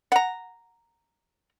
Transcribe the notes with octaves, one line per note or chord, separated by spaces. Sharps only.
F#5 A#5